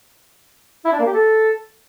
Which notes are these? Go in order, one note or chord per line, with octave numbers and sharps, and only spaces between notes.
E4
D4
A#3
G4
A4